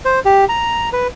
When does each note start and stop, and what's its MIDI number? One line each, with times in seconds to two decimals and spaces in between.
0.05 0.20 72
0.25 0.45 67
0.49 0.89 82
0.93 1.07 71